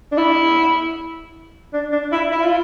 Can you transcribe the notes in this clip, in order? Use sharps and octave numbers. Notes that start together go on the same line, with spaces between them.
D4
E4
D4
D4
E4
E4
F4